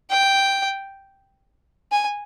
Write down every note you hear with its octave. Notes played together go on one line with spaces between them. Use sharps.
G5
G#5